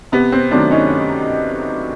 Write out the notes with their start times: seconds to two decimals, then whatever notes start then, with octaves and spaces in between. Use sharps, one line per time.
0.12 C3 B3
0.32 C4
0.51 D#3 F#3 A3 C4 D4
0.71 C#4 D#4